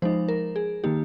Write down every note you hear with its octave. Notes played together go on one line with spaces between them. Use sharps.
F3 G#3 D#4 C5
A#4
G#4
D#3 A#3 D#4 G4